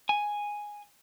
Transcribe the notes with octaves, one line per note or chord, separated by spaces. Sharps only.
G#5